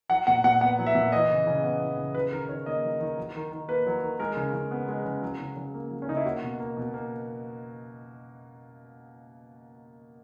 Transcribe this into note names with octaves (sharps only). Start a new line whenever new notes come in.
F#3 F#5
A#2 F#5
A#2 F#5
B3 F#5
F#3
E5
A#2
E3 D#5
C#3
C#3
B3
E3
C#3
F#3 B4
D#3 A#4
D#3 C#5
A#3 D#5
F#3
D#3
F#3
D#3
D#3
A#3 B4
F#3
D#3
G#3 A#4
C#3
C#3
B3
G#3
C#3
F#3
C#3
C#3
A#3
F#3
C#4
C#3 D#4
E4
A#3 F#4
B2
A#3
B2
A#3